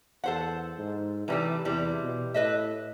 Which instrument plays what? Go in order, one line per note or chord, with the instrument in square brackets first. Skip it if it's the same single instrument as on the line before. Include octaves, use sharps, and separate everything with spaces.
[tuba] E2 [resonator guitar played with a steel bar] A4 C5 F#5
[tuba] G#2
[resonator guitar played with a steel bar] C3 G3 A3 [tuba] E3
[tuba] E2 [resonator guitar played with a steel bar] C3 E3 G3
[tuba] B2
[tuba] A2 [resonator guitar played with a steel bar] B4 D#5 E5